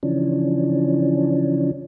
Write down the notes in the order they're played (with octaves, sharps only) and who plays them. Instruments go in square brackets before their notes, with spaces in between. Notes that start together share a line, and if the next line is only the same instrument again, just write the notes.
[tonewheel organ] C#3 E3 F3 C#4 D4